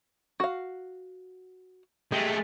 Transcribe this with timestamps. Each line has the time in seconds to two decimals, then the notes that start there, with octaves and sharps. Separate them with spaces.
0.40 F#4 F5
2.12 G#3 A3 G4